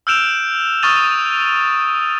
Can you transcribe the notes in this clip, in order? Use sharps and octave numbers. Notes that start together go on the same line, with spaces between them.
E6 F6 G6 D7 E7 F7
C#6 D#6 F6 A6 D#7 F7